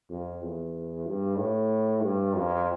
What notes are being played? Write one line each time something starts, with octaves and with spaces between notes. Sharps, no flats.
F2
E2
G2
A2
G2
F2